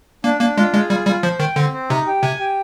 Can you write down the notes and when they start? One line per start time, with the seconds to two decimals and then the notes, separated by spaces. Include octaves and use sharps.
0.24 A#3 D4
0.41 A#3 D4
0.57 G#3 F4
0.74 G#3 G#4
0.90 G3 F4
1.07 G3 F4
1.23 F3 C5
1.40 D#3 G5
1.56 D3 C4
1.73 C4
1.90 C3 D#4
2.06 G4
2.23 C3 G#5
2.39 G4